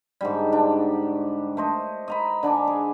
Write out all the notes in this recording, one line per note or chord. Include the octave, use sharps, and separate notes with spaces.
G#2 D3 G3
D4
A3 C5 D#5
D#5 A#5 B5
D3 D4 G#5 D6
G#4